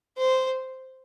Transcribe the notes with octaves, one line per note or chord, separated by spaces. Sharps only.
C5